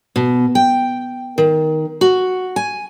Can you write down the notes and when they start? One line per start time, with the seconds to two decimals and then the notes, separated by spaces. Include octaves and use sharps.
0.16 B2
0.55 G5
1.38 D#3
2.01 F#4
2.56 G#5